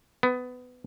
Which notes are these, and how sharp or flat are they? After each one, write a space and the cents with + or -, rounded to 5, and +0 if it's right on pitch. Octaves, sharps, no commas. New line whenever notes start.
B3 +20